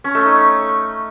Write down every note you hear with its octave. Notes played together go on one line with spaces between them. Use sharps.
C#4
A3
D#4